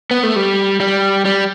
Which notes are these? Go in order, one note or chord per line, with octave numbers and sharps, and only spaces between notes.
B3
A3
G3
G3
G3